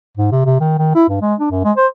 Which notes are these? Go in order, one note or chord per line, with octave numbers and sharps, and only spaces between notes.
G#2
C3
C3
D#3
D#3
E4
G2
G#3
D4
F#2
G#3
C5